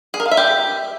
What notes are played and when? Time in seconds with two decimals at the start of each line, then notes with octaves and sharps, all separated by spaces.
0.14 G#4
0.20 A#4
0.26 F5
0.31 E5
0.37 G4